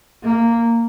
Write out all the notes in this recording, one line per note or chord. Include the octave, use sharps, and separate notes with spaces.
A#3